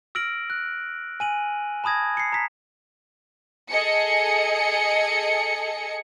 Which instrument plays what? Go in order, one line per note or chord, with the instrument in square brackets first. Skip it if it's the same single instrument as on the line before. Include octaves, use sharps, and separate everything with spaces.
[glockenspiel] E6 F6 A#6 D7 F#7
F#6
G#5 D#7 F#7
A5 B5 D#6 G#6 A#6
C7 C#7
A#5 B6
[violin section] G#4 A4 D#5 C#7